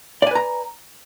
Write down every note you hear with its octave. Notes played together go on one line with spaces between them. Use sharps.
B4 D5 G#5 A#5